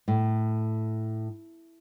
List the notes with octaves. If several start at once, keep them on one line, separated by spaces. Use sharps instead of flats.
A2